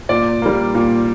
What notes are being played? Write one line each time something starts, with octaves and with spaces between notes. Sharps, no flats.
A#2 D5
G3 A#3
A#2